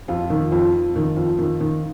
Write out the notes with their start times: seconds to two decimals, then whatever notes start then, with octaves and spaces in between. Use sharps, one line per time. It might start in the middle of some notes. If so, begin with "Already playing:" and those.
0.08 F2 F4
0.30 D#3
0.52 F2
0.74 F2
0.96 D#3
1.17 F2
1.39 D#3
1.61 D#3